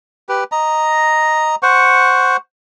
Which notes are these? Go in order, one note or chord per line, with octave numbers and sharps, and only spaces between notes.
G4 B4
D#5 A#5
C5 F#5 C#6